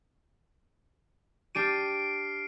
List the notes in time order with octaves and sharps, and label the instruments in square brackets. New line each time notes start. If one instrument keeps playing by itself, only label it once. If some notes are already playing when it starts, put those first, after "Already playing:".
[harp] D4 G4 D#7 [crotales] F6 C7 D7